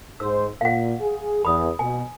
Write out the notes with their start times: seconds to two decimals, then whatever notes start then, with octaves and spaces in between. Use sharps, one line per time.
0.20 G#2 C5 E6
0.61 A#2 F5 F#5
1.01 G#4
1.45 E2 B5 D#6
1.79 B2 G#5